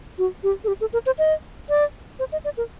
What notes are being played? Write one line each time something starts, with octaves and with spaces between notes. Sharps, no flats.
F#4
G4
A4
G4
A4
A#4
C5
D#5
D5
C5
D#5
D5
A#4